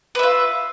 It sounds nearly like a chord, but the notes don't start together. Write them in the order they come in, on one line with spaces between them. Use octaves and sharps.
B4 E5 F4